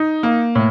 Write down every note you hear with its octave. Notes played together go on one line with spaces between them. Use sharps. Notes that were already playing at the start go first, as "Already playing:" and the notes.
Already playing: D#4
A#3
A2